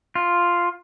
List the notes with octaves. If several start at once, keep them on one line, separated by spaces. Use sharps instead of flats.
F4